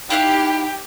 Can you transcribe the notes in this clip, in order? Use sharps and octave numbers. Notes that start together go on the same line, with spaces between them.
D#4 E4 G4 F5 G5 F#6